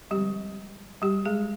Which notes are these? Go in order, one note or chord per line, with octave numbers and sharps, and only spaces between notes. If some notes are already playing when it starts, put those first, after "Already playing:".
D3 F3 G3 G#3 C4 G4
G3 G4
G#3 G#4